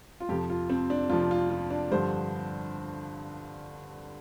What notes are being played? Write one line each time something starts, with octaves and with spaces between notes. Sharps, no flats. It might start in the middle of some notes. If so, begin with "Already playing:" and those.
F4
F2 C3 F3 G4
F4
C4
D4
F2 C3 F3 F4
F4
F4
D4
G2 D3 F3 C5